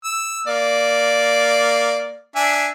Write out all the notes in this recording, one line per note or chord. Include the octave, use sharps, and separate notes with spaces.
E6
A#3 D5
D4 E5 G#5